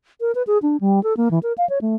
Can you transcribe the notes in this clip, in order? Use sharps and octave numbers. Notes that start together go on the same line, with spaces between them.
A#4
B4
G#4
D4
G3
A4
A#3
E3
A#4
F5
C#5
A3